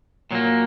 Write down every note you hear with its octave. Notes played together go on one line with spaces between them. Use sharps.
A#2 F#3 A#3